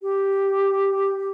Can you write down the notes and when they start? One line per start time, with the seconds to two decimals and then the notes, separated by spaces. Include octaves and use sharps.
0.02 G4